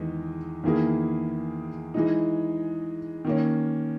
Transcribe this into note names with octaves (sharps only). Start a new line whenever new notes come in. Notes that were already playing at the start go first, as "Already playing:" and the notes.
Already playing: E2 D#3 G#3 D#4
E2 D#3 A#3 E4 G#4
E3 G#3 D#4
D#3 A#3 C#4